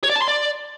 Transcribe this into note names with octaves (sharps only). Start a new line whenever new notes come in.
C#5
D5
A5
C6
D5